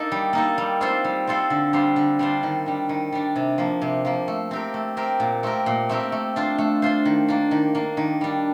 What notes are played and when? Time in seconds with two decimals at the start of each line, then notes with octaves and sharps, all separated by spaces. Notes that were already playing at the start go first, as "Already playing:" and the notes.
Already playing: A#3 D#4 A4
0.12 G3
0.33 A#3 D#4 A4
0.58 G3
0.81 C4 F4 A4 C5
1.04 G3
1.27 C4 F4 A4 C5
1.50 D3
1.73 G3 D4 F4 C5
1.96 D3
2.19 G3 D4 F4 C5
2.43 D#3
2.66 G3 D4
2.89 D#3
3.12 G3 D4
3.36 C3
3.58 F3 A#3
3.82 C3
4.05 F3 A#3
4.28 A3
4.51 C4 G4 A#4
4.74 A3
4.97 C4 G4 A#4
5.20 A#2
5.43 A3 C4 G4 A#4
5.66 A#2
5.89 A3 C4 G4 A#4
6.12 A3
6.36 D4 F4 C5
6.58 A3
6.82 D4 F4 C5
7.05 D#3
7.28 A#3 D4
7.51 D#3
7.75 A#3 D4
7.97 D#3
8.21 G3 D4